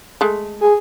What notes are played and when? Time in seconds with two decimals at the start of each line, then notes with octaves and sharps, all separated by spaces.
0.21 G#3 A3
0.61 G#4